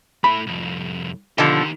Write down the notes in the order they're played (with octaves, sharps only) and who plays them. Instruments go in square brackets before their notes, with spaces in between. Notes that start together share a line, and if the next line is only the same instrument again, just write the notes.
[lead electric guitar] A3 E4 [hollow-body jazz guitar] B5
[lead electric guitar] C2 F2
[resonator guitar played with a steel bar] B2 D3 F3 [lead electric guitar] D#3 G4